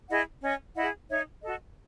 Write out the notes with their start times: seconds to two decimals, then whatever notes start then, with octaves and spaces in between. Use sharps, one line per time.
0.09 E4 G#4 D#5 F#5
0.42 C#4 D#5
0.76 E4 G#4 D#5 F#5
1.09 D#4 C#5 E5
1.43 F#4 A4 D#5